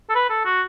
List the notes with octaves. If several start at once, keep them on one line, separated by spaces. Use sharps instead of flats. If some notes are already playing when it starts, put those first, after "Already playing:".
A4
B4
A4
F#4